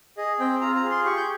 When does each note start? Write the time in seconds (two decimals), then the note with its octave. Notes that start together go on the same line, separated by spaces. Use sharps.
0.17 G#4 D#5
0.40 C4 G5
0.61 F4 A#5
0.76 A#5
0.84 G#4
0.91 C6
1.05 G4 C#6
1.17 G6